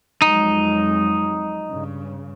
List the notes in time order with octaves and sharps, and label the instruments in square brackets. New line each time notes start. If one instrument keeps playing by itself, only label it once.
[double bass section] F2 F#3 G#3 [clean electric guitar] D#4
[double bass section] G2 C#3